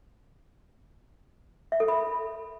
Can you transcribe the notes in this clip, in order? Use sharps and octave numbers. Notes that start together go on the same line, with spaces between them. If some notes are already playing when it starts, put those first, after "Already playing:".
E5
A4
B5